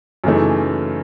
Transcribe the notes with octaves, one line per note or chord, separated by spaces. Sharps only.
F#2 C#3 E3 A3 D#4